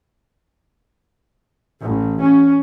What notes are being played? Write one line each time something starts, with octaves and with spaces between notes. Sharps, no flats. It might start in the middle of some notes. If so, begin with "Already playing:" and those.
A1
C#4